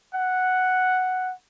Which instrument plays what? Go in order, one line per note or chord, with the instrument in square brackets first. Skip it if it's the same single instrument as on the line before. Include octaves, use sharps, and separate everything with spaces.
[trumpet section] F#5